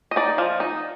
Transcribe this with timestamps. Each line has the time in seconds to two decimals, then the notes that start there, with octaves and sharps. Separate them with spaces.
0.11 D#5
0.16 D#4 D5
0.38 F3
0.60 D#4